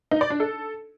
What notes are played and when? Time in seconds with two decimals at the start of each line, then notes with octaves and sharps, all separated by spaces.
0.11 D#4
0.21 D5
0.30 D4
0.40 A4